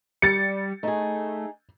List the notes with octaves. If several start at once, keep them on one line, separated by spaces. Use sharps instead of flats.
G3 A6 C#7
A3 D#4 G#4